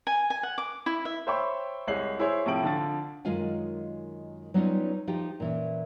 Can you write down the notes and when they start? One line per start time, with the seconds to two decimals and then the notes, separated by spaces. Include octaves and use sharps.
0.07 G#5
0.30 G#5
0.43 F#5
0.58 D6
0.86 E4
1.05 E5
1.27 C5 C#5 E5 G5 B5 C#6
1.88 C2 G#3 C#5 C7 F#7
2.19 E4 G#4 C5 C#5
2.46 A2 C3 F3 E4 D7 F#7
2.63 D3 F3 A6
3.25 F#2 D#3 G#3 F4 F5 G#5
4.54 F#3 G3 B3 C#4 D#4 F4
5.07 F3 D#4 F4 G4
5.40 A#2 E3 C#4